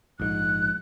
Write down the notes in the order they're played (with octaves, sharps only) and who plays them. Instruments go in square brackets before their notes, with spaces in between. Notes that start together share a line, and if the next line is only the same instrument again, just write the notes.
[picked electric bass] A#1 G#2 [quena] F#6